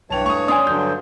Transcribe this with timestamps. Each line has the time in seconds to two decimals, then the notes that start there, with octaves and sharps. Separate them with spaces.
0.10 B1 G2 E3 C#5 G5 A5 F7
0.26 A3 C#6 D#6
0.48 C#4 D5 G#5 C6 D#6
0.67 G2 D3 F#3 G6